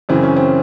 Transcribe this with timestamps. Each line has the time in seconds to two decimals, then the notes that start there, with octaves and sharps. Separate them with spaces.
0.09 F#2 C#3 E3 C4
0.24 C#4
0.36 C4